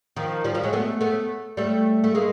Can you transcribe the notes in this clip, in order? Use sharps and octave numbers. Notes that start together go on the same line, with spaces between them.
D#3 F3
F3 G3
F3 G3
F#3 G#3
A3 B3
A3 B3
G3 A3
A3
G#3 A#3